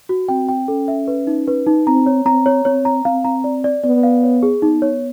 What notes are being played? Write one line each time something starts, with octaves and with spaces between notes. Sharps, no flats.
F#4
C4 G5
G5
C#4 A4
E5
B4
D#4
B4
D#4
C4 A#5
C#5
C4 A#5
C#5
C4 C#5
A#5
C4 F5
A#5
D5
D5
B3 D5
F5
C#5
G#4
B3 D#4
C#5